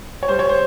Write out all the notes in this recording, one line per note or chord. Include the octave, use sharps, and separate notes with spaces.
C#5
G3 C5
C#5
C5